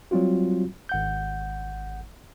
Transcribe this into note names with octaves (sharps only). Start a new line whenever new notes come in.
F#3 G3 C4 F4 F#4
G#1 F#5 G6